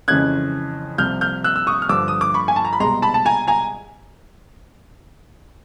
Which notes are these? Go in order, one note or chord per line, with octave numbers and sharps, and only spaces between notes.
F2 C#3 E3 G#3 C#4 F#6 G#6
C2 C3 F3 F6 G6
F6 G6
E6 F#6
E6
C#6 D#6
F6
G2 D3 F3 D6 E6
D#6
D6
B5 C#6
G#5
A5
A#5
B5
C2 B2 G#3 A#5 C6
A5 B5
A5
G#5 A#5
G#5 A#5